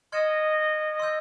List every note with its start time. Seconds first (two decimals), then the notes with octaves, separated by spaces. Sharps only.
0.12 D#5 C6 F6 G#6 C#7 E7
1.00 C6 E6 G6